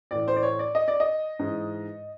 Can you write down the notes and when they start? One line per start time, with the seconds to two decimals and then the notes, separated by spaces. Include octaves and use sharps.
0.11 A2 E3 D5
0.28 C5
0.36 D5
0.43 C#5
0.59 D5
0.75 D#5
0.88 D5
1.00 D#5
1.39 G#2 E3